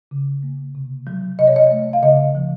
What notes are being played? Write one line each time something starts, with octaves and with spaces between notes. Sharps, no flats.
C#3
A#3
C3
F#3
C3 D#5
C#5
D#5
A3
F5
C#3 D#5
F3